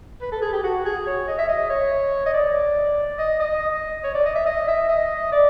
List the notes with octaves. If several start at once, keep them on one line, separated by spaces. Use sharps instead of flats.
B4
A4
G#4
G4
F#4
G#4
C#5
D#5
E5
D#5
C#5
D#5
D5
D#5
D#5
C#5
D5
D#5
E5
D#5
E5
D#5
D5